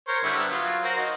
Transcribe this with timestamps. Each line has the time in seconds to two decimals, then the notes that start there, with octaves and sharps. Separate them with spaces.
0.08 A#4 C5 C#5
0.23 D3 G3 E4
0.37 B3
0.50 F#3 F4
0.83 F#4 A#4 C5
0.97 D#4